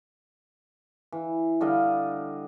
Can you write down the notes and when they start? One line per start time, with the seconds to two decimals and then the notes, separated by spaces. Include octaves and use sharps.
1.12 E3
1.61 D3 G3 D#5 F5